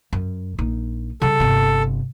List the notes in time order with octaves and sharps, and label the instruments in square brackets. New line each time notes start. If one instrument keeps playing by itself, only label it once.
[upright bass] F#2
A#1 D#4
[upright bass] C#3 G3 [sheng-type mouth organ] A4
[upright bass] G1 C3